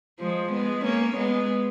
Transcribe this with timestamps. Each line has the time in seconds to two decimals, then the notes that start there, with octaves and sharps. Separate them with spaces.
0.20 F3 G#3
0.52 G#3 B3
0.85 A#3 C#4
1.16 G#3 B3